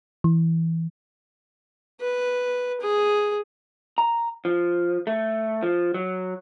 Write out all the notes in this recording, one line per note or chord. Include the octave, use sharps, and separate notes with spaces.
E3
B4
G#4
A#5
F3
A3
F3
F#3